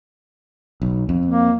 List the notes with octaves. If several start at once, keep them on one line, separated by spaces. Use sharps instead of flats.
B1
F2
A#3